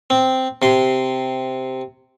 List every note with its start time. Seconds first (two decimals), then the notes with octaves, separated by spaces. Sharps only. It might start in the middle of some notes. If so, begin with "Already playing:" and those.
0.10 C4
0.62 C3 C6